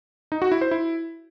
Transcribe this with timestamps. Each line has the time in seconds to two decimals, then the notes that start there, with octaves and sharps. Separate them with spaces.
0.32 D#4
0.42 F#4
0.52 E4
0.61 C5
0.71 E4